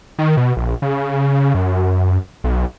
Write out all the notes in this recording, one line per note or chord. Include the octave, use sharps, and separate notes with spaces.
D#3
B2
A#1
C#3
F#2
B1